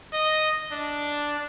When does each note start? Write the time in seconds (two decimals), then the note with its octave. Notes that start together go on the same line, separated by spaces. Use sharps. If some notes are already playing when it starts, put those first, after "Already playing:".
0.13 D#5
0.72 D4